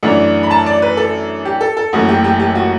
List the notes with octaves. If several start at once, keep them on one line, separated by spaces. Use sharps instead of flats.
F#2 E3 A3 D4 F#5
B5
A5
D5
B4
A4
G4
A4
A4
F#1 F#2 E3 A3 F#4
G4
G4
G4
F#4